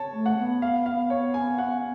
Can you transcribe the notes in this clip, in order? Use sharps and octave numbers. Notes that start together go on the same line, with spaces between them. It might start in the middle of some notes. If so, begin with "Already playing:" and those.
Already playing: C#5 A5
A3
F#5
B3
F5
F5
C#5
G#5
F#5